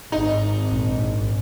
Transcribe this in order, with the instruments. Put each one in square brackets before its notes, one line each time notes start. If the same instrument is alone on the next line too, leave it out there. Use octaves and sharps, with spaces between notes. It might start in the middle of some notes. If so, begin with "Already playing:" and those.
[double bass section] G#1 [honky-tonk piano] D#4
[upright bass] A#1